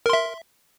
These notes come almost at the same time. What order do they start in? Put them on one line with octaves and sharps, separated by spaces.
A#4 C6 E5